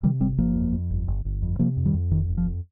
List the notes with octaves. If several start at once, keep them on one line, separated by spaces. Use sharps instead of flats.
C3 D#3 G3
G1 G3 C4
G1 F3 A#3
F2
F2
G1
G1
G1
F2
C3 F3 A#3
F2
D#3 G3
F2
F1 D#3
F1
F3
F2